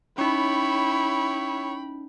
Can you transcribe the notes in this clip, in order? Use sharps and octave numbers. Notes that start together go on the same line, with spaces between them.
C#4 D#4 E4 C#5 G5 B5